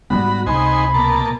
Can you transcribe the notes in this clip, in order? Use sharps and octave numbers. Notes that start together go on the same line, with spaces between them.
G#2 G3 B3 F#4 B5
C#2 C3 D#4 C5 G#5 B5
B2 A#3 A5